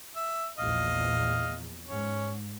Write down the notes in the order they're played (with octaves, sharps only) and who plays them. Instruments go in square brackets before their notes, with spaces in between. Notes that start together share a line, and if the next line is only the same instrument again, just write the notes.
[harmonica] E5
[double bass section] A#1 E2 [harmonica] D#5 F5
[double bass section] G#2 [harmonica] C#4 C#5